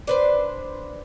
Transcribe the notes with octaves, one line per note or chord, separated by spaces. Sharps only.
D4 B4 C5